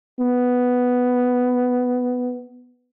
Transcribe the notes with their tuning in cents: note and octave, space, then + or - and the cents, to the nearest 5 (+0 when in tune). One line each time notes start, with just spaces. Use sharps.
B3 +5